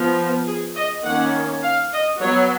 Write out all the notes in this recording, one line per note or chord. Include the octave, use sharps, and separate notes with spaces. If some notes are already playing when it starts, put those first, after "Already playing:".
Already playing: F3 B3
G#4
D#5
D#3 A#3 C#4 F#5
F5
D#5
F#3 B3 C#5